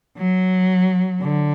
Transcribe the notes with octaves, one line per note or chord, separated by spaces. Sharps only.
F#3
D3